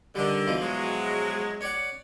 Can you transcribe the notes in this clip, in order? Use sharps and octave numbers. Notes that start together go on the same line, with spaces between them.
D3 D#3 G3
B2 E3 F3
F#3 G#3
C#5 D5 F#5